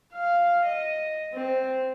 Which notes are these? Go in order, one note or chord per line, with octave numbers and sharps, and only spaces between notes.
F5
D#5
C4